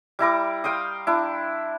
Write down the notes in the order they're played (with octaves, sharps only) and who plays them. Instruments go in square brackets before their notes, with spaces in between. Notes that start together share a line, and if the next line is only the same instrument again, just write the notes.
[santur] G3 E4 A#5 D6
F5 G5 C6 D#6
D4 E4